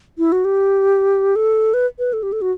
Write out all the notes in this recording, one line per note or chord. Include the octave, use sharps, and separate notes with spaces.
E4
F#4
G4
A4
B4
B4
A4
G4
A4
F#4